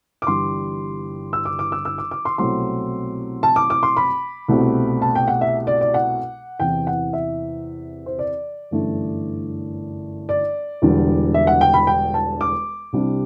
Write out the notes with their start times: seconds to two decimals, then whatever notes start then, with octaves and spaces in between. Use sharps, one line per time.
0.22 D6
0.27 G1 G2 E3 G3 C6
1.33 E6
1.45 D6
1.59 D6
1.72 E6
1.85 E6
1.98 D6
2.11 D6
2.25 C6
2.38 C2 B2 F#3 A3 C4 C6
3.43 A5
3.56 D6
3.70 D6
3.83 C6
3.97 B5
4.48 C2 B2 A3 C4
5.02 A5
5.15 G5
5.28 F#5
5.41 E5
5.67 D5
5.81 D5
5.94 F#5
6.60 E2 C3 E3 G5
6.87 F#5
7.13 E5
8.06 C5
8.19 D5
8.71 G1 F#2 E3 A3 D4
10.29 D5
10.82 E1 E2 D3 G3
11.34 E5
11.47 F#5
11.61 G5
11.74 B5
11.87 G5
12.14 A5
12.41 D6
12.93 C2 C3 G3 D4